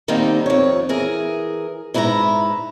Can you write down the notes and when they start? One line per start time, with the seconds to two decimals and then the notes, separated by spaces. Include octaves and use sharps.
0.08 D3 D#3 G3 A#3 C4 D#4
0.46 F2 C#5
0.89 E3 G#4 A#4
1.94 G#2 E4 B4 A5 A#5